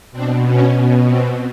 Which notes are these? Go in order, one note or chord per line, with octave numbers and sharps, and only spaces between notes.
B2 C4 D4
C#4
B2
C4